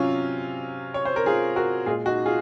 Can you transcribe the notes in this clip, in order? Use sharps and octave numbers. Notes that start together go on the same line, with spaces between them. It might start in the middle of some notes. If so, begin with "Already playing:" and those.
Already playing: C3 F#3 C#4 F4
C#5
C5
A#4
F4 G#4
F#4 A#4
A#2 G#3 F4 G#4
D#4 F#4
F4 G#4